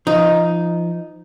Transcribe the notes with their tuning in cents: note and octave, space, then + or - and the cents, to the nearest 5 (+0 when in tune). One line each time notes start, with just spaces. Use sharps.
F3 -25 D#4 +0